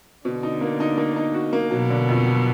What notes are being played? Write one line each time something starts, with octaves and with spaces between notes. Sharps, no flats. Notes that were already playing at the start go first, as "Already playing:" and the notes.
B2 D3
D#4
A#3
D#4
A#3
D#4
F#4
A#3
B2 F#3
D3
F2
F#3